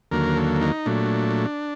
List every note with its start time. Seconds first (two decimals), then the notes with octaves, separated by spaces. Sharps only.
0.11 D#2 D3 F#3 A#3 A#4
0.37 A4
0.61 D#4
0.86 A#2 F#3 A3 D4